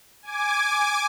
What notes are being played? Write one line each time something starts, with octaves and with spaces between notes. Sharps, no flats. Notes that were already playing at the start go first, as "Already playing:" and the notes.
G#5 D6